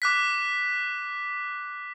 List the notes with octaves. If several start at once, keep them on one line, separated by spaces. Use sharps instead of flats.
D6 F#6 B6